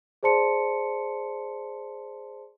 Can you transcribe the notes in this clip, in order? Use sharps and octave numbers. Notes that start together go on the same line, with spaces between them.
G#4 C5 D5 A5 C6 C#7